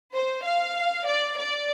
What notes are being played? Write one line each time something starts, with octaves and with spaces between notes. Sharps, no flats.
C5
F5
D5
D5